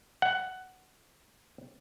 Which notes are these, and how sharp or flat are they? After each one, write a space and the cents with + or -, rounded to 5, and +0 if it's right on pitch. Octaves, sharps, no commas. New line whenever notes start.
F#5 +10